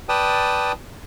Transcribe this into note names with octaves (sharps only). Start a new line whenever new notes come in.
B4 D5 G5 A5 D#6